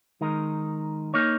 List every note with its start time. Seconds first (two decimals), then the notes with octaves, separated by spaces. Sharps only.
0.21 D#3 G#3 D#4 A#4
1.14 A#3 D#4 C#5